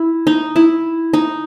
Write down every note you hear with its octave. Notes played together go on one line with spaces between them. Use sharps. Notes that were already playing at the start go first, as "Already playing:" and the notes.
Already playing: E4
D#4
E4
D#4